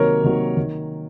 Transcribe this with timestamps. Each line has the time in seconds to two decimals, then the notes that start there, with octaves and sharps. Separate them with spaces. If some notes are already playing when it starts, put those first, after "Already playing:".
Already playing: C3 D#3 F#3 A#3 A#4 C#5
0.24 C3 D#3 F#3 A#3
0.57 D#3